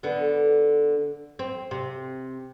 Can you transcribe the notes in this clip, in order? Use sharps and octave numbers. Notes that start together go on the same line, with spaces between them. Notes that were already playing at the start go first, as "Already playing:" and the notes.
D3 B3
C4
C3